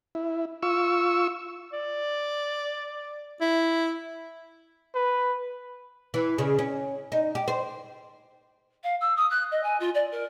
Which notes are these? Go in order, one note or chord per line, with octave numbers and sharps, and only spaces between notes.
E4
F4 C#6 E6
D5
E4
B4
E3
C#3
C#4
D#4
G4
C5
F5
E6
D#6
F#6
D#5
G#5
F4
D5
A#4